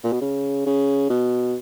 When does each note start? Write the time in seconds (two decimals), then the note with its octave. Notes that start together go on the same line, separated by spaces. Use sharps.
0.04 A#2
0.12 B2
0.21 C#3
0.66 C#3
1.10 B2